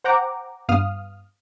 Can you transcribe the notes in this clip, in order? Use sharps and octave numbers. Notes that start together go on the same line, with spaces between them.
C5 F#5 G5 A#5 D6
G2 B3 F5 D#6 F6